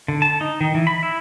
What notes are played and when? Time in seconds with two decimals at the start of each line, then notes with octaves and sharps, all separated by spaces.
0.08 D3
0.22 A5
0.41 D#4
0.61 D#3
0.75 E3
0.87 B5
1.03 E4